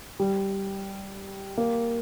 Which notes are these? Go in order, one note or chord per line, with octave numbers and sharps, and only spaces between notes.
G3
A#3